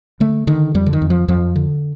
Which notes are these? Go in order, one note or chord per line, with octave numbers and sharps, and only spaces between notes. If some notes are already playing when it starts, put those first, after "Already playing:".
D3 A3
D3 D#3
F2 G3
D3
D#3
F2
F3
F2 F3
D3